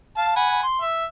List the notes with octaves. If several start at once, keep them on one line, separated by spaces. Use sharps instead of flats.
F5 A5
F#5 G#5 B5
C6
E5